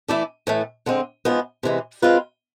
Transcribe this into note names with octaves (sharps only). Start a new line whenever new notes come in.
E3 A3 E4 A4 D5
A2 E3 A3
D3 G#3 C4
G#2 F3 G#3 B3
C3 E3 G#3
G#3 C4 F4 B4